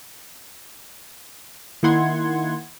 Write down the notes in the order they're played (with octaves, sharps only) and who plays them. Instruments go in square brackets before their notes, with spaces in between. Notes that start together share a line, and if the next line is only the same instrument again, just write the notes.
[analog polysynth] D#3 A#3 E4 F#5 C6 G#6